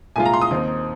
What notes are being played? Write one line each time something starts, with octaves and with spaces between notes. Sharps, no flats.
C2 A#2 G#3 F4 G#5
A#5
C6
D#6
D#2 D#3 C4 D#4